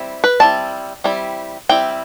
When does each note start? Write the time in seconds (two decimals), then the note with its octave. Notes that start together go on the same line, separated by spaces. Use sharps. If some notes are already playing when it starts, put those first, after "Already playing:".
Already playing: G3 C4 E4
0.24 B4
0.40 G3 C4 E4 A5
1.04 G3 C4 E4
1.69 G3 C4 E4 G5